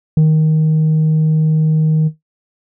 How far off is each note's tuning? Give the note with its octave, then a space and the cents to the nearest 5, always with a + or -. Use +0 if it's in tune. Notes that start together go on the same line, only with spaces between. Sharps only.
D#3 +10